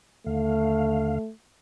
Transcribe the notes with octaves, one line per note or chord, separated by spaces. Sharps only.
D#2 D3 A3 F5